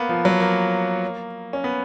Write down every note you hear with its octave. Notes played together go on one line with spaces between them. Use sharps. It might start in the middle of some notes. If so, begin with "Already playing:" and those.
Already playing: A#3 B3
F3
F#3
A#3
C#4
B3